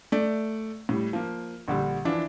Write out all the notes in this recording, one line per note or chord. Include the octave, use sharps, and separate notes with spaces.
A3 D5
A2 G3
F3 A#3
A#1 D3 G3
E3 F3 D4 E5